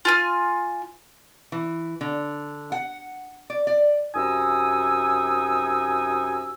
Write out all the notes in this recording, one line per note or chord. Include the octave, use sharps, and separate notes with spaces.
F4 G#5 F6
E3
D3
F#5
D5
D5
F#2 C3 D#4 G#5 D#6 E6